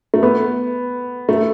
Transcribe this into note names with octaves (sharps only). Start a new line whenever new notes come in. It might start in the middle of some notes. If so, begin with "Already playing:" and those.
A3
B3
A3